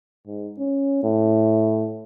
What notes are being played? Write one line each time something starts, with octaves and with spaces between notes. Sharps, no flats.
G#2
C#4
A2